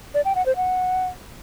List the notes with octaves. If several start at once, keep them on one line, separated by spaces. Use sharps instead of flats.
D5
G5
F#5
C5
F#5